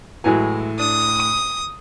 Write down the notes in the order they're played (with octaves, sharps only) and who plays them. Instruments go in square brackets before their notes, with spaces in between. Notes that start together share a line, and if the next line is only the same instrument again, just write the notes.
[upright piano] A2 G#5 [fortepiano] E3 F#3 G#3
[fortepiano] D4 [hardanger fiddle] D#6